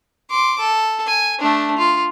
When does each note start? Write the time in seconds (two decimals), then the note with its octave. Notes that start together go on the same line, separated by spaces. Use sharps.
0.30 C6 D6
0.59 A4
1.06 G#5
1.39 A3 D4
1.78 F4